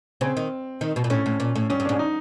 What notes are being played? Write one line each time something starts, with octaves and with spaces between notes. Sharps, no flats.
C#3 C4
D#3
D#3
B2
A#2
A2 C#4
A2
A#2
A2
G2 C#4
G2
G#2 D4
D#4